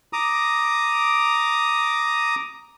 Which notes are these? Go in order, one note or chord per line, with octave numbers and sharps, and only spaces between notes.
A#5 D6 D#6